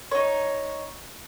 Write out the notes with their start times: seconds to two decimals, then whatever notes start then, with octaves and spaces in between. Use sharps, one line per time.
0.11 D#4 C#5